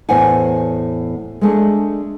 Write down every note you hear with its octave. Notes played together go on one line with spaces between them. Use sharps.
E2 A2 C5 C#5 F#5 G#5
G#3 A3 D4